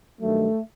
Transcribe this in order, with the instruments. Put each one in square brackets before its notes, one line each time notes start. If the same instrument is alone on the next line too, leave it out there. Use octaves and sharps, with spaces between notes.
[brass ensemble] G2 D#3 F#3 A3